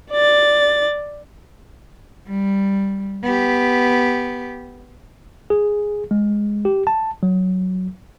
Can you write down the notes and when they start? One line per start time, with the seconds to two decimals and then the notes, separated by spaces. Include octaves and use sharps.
0.11 D5 A6
2.28 G3
3.23 B3 G4
5.50 G#4
6.11 G#3
6.65 G4
6.87 A5
7.23 F#3